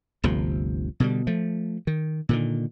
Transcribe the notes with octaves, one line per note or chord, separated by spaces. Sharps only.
G1 D2 C3 F3
B2 D3 G3
F3 A3
D#3
A#2 D3 D#3